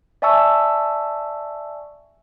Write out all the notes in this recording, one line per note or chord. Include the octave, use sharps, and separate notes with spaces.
D5 E5 G#5 A5 C#6 E6